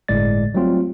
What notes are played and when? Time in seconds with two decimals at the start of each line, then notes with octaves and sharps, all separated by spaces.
0.08 G1 A2 G#3 D5 A6
0.54 F#3 G3 A3 C4 F4